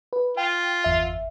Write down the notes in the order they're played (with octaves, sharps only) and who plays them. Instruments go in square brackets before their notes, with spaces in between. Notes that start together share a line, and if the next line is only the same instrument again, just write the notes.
[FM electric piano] B4
[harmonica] F4 [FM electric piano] G5
[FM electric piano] G1 E2 E5